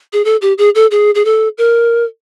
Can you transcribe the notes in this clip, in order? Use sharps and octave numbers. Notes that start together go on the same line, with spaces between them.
G#4
A4
G4
G#4
A4
G#4
G#4
A4
A#4